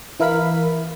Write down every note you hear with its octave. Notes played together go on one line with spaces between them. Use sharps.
E3 E4 A#4 F5 B5 B6